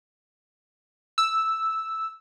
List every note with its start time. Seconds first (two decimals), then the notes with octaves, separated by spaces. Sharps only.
1.18 E6